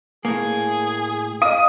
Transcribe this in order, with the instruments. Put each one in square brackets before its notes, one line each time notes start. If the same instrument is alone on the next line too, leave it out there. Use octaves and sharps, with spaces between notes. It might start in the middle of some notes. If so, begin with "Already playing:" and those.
[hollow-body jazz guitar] A2 A#3 [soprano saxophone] G#4
[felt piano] D#5 F5 [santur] D#6